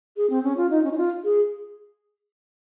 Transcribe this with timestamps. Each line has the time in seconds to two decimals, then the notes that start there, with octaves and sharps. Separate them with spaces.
0.17 G#4
0.30 C4
0.44 C#4
0.57 F4
0.70 D#4
0.84 C#4
0.92 D#4
0.97 F4
1.24 G#4